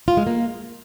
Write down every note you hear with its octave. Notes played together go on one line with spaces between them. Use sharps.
F4
G#3
A#3